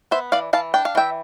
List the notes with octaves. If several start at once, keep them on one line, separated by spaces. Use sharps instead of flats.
B3 C5 E5
E3 D5 F5
E3 F5 A5
D4 G5
F5
E3 E5 G5